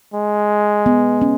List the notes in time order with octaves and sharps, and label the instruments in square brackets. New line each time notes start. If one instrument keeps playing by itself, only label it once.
[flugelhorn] G#3
[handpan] B3
C#4